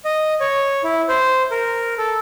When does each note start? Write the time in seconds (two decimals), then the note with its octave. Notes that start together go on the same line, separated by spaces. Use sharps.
0.05 D#5
0.40 C#5
0.84 E4
1.09 C5
1.51 A#4
1.98 A4